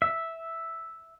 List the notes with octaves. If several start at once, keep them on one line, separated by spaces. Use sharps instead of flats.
E5